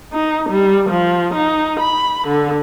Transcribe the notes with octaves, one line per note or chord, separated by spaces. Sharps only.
D#4
G3
F3
D#4
B5
D3